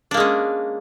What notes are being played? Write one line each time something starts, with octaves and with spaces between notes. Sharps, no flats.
G#3 A#3 C#4 D4